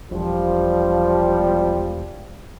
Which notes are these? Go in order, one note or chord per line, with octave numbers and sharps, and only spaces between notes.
E1 F3 G3